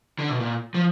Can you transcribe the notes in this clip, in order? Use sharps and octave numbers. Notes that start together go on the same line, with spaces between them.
D3
B2
A#2
F3